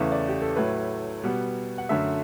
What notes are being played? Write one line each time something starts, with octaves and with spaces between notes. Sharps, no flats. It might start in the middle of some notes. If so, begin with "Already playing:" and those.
Already playing: E2 C#3 E3 A3
D5
G4
A4
A2 F#3 A3 B4
B2 G3 B3
F#5
F#2 D3 A3 E5